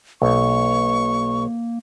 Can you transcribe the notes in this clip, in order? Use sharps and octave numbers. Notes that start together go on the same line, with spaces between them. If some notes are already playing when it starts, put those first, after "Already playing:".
B1 A#3 C#6